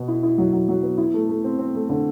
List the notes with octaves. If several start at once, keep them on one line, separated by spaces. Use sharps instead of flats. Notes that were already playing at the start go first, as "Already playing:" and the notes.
Already playing: B2 B3
E4
E4
F#3
F#3
F#3
B3
E4
A3
A3
C4
C4
A3
D3